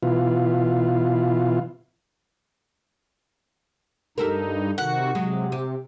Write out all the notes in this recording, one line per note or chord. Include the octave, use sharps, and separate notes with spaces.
B2 E3 F4
G2 D#4 G4 A4 A#4
C3 D#3 F#4 F#5
C3 F#3 G#3 F#4
G4